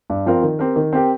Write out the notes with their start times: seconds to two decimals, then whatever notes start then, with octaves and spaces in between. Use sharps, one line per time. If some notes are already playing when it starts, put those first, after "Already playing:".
0.10 G2
0.26 F3 C4 F4 A#4
0.43 D#3
0.59 C4 G4 A#4
0.76 D#3
0.93 C4 G4 A#4